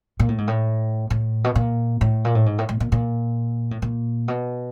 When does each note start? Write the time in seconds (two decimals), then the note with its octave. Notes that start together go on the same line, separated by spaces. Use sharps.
0.19 A#2
0.29 A2
0.38 G#2
0.47 A2
1.10 A2
1.44 B2
1.55 A#2
2.01 A2
2.25 A#2
2.35 A2
2.46 G#2
2.58 A2
2.69 A2
2.80 A#2
2.92 A#2
3.71 A2
3.82 A#2
4.28 B2